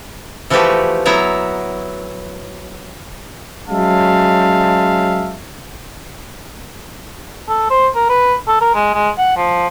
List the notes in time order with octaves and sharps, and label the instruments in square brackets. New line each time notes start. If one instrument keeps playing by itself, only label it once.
[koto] E3 F3 A3 F#4 G4 B4
F#3 B3 E4 E5 A#5
[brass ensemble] F#3 G#3 C#4 E5 F5 A5
[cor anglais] A4
C5
A#4
B4
A4
A#4
G#3
G#3
F#5
F3